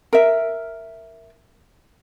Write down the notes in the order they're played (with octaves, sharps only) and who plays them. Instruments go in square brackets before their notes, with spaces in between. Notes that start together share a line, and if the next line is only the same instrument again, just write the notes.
[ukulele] A#4 E5